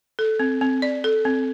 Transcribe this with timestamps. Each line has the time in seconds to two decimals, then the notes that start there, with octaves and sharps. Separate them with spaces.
0.19 A4
0.40 C4
0.61 C4
0.82 D5
1.04 A4
1.25 C4